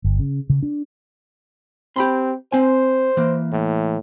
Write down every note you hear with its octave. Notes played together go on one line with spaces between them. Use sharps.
G1
C#3
C#3
D4
C4 G4 B5 C6
C4 C5 G#5
E3 A#3
A2